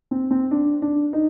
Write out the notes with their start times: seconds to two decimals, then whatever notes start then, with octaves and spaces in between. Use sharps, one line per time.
0.11 C4
0.31 C4
0.51 D4
0.82 D4
1.13 D#4